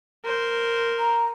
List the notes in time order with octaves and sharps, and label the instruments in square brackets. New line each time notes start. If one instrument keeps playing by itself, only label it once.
[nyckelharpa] A#4 C5
[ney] A#5